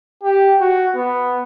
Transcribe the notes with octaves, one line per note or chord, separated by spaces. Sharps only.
G4
F#4
B3